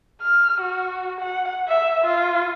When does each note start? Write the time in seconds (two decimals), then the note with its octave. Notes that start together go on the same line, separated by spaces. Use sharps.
0.22 F6
0.61 F#4
1.21 F#5
1.68 E5
2.05 F4